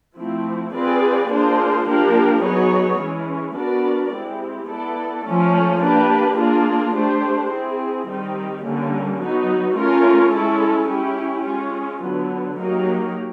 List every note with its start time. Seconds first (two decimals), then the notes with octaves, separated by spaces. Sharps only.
0.17 F3 A3 C4 E4
0.73 C4 F4 G#4 B4 D5
1.29 A#3 D4 F4 G#4 C5
1.86 F3 A#3 D4 G4 A#4
2.42 F#3 B3 D#4 G#4 C#5
2.99 E3 G#3 C#4
3.55 B3 D4 F#4 A#4 D5
4.12 G#3 C4 E4 G4
4.68 B3 E4 A4 D5
5.25 F3 A3 C#4
5.81 A#3 D4 G4 B4
6.38 A#3 D4 F4 G#4
6.94 A3 D4 G4 C5
7.50 C4 E4 G#4
8.06 D#3 G3 C4 D#4 G4
8.64 D3 G3 A#3 C#4
9.19 F#3 B3 D#4 F#4
9.75 A3 C#4 F4 A#4
10.32 G#3 C#4 E4 A4
10.88 C#4 E4 G4
11.45 G#3 C#4 F4
12.01 D3 F#3 B3
12.57 F#3 A#3 D#4 G4 A#4